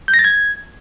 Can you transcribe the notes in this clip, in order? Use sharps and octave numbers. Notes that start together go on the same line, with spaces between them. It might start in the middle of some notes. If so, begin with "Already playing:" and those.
G6
A#6
A6
G#6